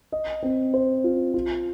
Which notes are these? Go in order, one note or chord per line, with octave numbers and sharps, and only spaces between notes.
D#5
C4
C5
F4
F4